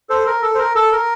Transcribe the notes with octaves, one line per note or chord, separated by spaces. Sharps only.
A4 C5
A#4
A4
C5
A#4
A4
A#4